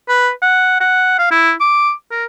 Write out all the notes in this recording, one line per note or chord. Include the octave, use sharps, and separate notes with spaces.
B4
F#5
F#5
F5
E4
D6
A#4